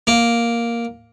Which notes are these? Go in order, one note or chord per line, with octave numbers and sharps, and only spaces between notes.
A#3